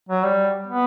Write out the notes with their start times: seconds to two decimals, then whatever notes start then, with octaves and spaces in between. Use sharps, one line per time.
0.09 F#3
0.24 G3
0.67 B3